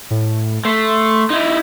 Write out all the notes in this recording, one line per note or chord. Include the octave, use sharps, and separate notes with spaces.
A2
A3 C6
D#4 E4